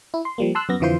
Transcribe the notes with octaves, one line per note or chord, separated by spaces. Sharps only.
E4
C6
F3 G3 A#3
A5 C6 E6 F#6
F#2 B3 A#6
F2 D3 E3 F4 C5 C6